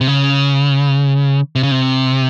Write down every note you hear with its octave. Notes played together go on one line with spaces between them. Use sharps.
C3
C#3
C3
C#3
C3